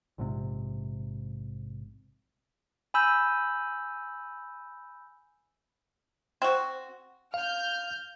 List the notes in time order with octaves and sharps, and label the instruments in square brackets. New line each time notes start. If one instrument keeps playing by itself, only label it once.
[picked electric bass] A#1 G#2 C3
[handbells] G#5 B5 E6 G6
[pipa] C4 F#4
[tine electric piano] F5 [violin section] F6 G6